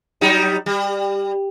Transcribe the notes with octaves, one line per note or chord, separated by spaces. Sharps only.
F#3 G3 D#4
G3